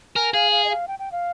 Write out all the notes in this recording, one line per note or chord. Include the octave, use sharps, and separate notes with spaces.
A#4 G#5
G#4 F5
F5
D#5
F5
G5
G5
F5